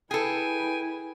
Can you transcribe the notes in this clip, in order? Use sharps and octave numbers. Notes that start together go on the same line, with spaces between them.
E4 G#4 A4 B4 G5 G#5